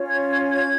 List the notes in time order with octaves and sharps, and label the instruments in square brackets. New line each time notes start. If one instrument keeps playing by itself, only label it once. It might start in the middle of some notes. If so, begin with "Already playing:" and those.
Already playing: [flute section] C#4 F4 C#5
G#6
G#6
G#6